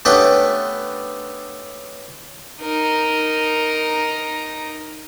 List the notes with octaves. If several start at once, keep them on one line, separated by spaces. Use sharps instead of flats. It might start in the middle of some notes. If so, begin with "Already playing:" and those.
A3 B3 C#4 D4 G4 B4
D#4 A#4